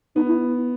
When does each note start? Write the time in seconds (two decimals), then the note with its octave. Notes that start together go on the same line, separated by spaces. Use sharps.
0.16 B3 D#4
0.28 E4